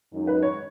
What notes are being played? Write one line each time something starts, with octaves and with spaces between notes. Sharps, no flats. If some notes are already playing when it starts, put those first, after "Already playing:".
F#2 D#3 G#3 D#4
B4
C#5